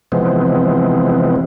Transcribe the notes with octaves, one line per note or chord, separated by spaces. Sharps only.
C3 E3 F3 G#3 B3 C4